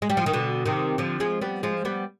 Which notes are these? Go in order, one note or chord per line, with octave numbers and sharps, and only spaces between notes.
G#3
G3
F3
D#3
B2 D3
C3 D#3
D3 F3
F3 G#3
G3 B3
F3 G#3
G3 B3